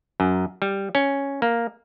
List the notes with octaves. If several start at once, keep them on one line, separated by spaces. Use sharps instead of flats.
F#2
G3
C#4
A#3